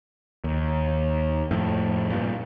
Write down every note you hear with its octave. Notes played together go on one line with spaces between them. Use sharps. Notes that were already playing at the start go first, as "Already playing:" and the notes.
D#2
F2 A2
G2 A#2